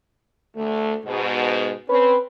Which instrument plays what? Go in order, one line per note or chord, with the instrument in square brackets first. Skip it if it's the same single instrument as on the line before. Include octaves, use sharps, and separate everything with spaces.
[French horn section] D2 A3
G#2 B2
[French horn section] C4 C#4 [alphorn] B4